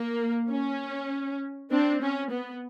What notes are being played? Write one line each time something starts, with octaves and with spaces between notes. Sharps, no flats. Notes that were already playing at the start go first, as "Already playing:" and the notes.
Already playing: A#3
C#4
C4 D4
C#4
B3